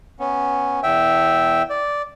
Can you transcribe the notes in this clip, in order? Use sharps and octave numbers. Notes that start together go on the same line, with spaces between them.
B3 C#4
E2 E5 G5
D5